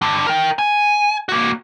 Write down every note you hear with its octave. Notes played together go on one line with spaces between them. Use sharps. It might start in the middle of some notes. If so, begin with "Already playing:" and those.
G2 D3
A#4 G5
G#5
A#3 F#4